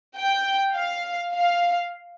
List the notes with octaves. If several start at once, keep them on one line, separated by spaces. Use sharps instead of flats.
G5
F5
F5